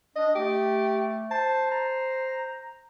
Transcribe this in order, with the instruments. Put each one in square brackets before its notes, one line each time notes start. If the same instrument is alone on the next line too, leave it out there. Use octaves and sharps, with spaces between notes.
[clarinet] D4 [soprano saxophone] D#5
[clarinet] A3 [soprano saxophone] G4
[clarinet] C5 [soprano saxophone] A5
[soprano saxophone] A#5